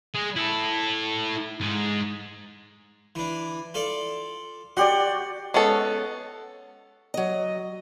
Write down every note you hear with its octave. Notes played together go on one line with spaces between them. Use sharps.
G#3 G#4
E4 A4
G#2 G#3
E3 D4
F4 A4 D5
F#4 G4 D5 F#5 C6
G#3 B3 C#4 A4
F#3 D#5